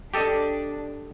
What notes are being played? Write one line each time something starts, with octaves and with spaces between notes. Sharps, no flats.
D4 G4 A4 D#5